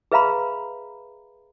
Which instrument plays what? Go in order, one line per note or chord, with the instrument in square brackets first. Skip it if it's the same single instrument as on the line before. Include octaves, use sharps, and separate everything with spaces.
[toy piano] G#4 B4 E5 F5 A#5 B5